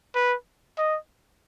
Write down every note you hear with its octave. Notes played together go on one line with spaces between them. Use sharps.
B4
D#5